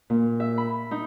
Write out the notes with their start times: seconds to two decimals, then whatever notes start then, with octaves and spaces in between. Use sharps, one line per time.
0.10 A#2
0.40 E5
0.58 B5
0.91 D#4